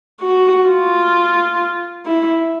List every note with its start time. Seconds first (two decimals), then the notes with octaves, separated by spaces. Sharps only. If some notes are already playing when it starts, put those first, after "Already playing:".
0.20 F#4
0.68 F4
2.06 E4